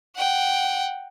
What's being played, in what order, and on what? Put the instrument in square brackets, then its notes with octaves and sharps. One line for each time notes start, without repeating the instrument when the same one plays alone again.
[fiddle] F#5 G5